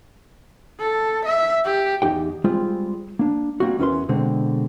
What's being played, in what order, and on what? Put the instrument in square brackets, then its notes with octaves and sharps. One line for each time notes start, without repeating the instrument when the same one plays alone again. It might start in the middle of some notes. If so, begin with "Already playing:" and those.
[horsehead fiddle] A4
E5
G4
[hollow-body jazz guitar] E2 D#4 G4 G5
G3 G#3 C4 F4 G#4
A#3 D4
G3 A#3 C4 F#4
E2 C#4 E4 A#4 B4 C6
B2 D3 G#3 C4